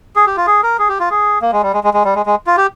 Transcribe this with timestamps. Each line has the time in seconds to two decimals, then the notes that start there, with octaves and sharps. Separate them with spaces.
0.16 G#4
0.27 G4
0.37 F4
0.47 G#4
0.63 A#4
0.79 G#4
0.89 G4
1.00 F4
1.10 G#4
1.42 A#3
1.52 G#3
1.63 G3
1.74 G#3
1.84 G#3
1.94 G#3
2.05 G3
2.15 G#3
2.26 G#3
2.47 F4
2.57 G4